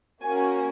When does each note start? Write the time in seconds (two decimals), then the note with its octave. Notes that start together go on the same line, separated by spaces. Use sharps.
0.21 A#3 C#4 F#4 G#5